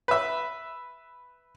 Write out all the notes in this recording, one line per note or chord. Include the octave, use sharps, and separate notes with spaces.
B4 E5